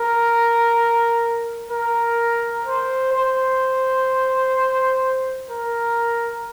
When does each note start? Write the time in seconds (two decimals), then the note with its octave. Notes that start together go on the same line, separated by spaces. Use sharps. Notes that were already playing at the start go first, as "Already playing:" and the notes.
Already playing: A#4
1.71 A#4
2.65 C5
3.13 C5
5.50 A#4